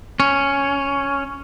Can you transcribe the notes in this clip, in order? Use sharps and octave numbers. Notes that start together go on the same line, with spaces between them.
C#4